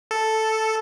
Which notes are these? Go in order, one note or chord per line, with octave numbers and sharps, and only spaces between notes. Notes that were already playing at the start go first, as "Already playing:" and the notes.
A4